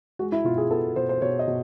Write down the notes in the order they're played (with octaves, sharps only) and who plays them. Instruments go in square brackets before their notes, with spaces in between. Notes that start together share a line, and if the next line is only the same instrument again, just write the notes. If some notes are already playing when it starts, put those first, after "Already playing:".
[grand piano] G#3 F#4
E4
B2 F4
G#4
B3 A4
B2 C5
C5
B2 C#5
D#5
B2